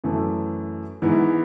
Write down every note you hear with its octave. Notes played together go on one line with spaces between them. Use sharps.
F#2 E3 A3
G#2 E3 B3 E4